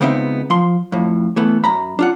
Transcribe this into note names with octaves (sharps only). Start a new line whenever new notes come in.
C#2 C#3 B3 C4 D#4 E5
F3 C6
F2 A2
E3 A3 B3
F#2 A#5 B5
D4 F4 F#5